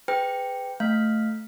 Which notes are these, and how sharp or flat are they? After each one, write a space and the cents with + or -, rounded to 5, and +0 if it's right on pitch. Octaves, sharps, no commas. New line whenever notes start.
G#4 +0 B4 +30 G5 +0
A3 +0 F5 +0